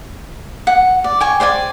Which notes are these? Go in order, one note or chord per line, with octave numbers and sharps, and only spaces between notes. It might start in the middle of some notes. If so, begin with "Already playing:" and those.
F#5
D5
G5 G#5 C#6
C5 D5 G5 G#5